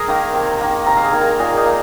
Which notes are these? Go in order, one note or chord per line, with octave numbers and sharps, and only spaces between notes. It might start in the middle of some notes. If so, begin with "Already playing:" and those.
Already playing: G#4 A#4 G#5 A#5
D#3 A#3
C3
D#3 A#3
C3 A#4 A#5
F5
G#4 G#5
D#3 A#3
A#4 A#5
A#2 G#4 G#5
D#4 D#5
A#3